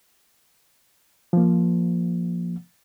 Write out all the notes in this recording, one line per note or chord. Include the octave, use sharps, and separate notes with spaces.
F3 A#3